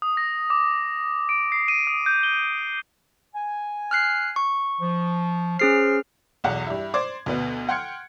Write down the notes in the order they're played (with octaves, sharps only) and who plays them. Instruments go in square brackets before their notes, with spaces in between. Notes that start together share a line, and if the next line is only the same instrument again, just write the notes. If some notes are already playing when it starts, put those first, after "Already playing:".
[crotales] D#6
A#6
D6
D7
C7
D#7
D#6
G6
G7
[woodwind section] G#5
[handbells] F6 F#6 C7
C#6
[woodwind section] F3
[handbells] C#4 G#4 C7 [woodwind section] C5 F6
[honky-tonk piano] B1 E2 F#5
G2 E4
C5 D5 D6 G#6
D2 B2 B3
F#5 G5 C6 F6 G#6 C#7